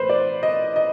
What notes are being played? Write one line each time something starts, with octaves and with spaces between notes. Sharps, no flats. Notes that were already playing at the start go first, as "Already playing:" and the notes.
Already playing: A2 E3 B4 C5
D5
D#5
D#5